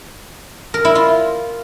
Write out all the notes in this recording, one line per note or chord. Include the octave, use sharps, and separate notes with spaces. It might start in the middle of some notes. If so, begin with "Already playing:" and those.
A#4
E4
F4